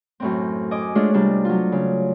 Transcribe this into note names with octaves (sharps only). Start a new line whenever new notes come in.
F#2 A2 C4
D#5 G#5 D6
G#3 A3 D4 F4 G#4 C#5
C3 G3 D4 F4
F#3 F4
C#3